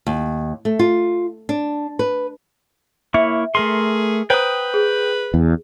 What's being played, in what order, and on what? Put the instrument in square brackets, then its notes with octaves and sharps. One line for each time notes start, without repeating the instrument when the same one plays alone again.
[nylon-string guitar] D#2
A3
F4
D4
B4
[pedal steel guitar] A#3 E4 C#5 [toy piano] E5
[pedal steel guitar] A3 A#4 C6 [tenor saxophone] G#4
[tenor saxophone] B4 [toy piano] C5 F#5 A#5 [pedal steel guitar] G5 D#6
[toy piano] G#4
[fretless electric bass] E2